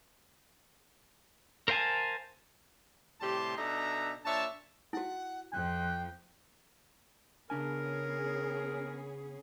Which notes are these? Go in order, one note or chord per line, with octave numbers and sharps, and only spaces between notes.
A#4 C5 F5 G#5 A5
A2 C3 G3 G4 A5 C6
B2 D4 D#4 A4 E5 A#5
A#2 D4 C#5 E5 A5
E4 F#4 F#5
F2 G5 F#6
C#3 B3 C#4 D4 G#4 A#4 G#5